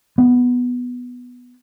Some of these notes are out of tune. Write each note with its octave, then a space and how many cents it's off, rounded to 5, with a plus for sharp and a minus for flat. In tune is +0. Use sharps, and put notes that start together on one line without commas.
B3 +0